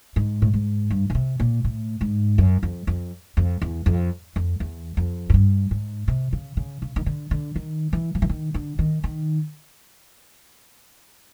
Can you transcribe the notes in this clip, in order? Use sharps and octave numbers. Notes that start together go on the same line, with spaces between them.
G#2
A2
G#2
G2
C#3
C3
A#2
A2
G#2
F#2
F2
F2
F2
E2
F2
F2
E2
F2
G#2
G2
G#2
C3
C#3
C#3
C#3
D#3
D3
D3
D#3
E3
F3
E3
D#3
D3
D#3
D#3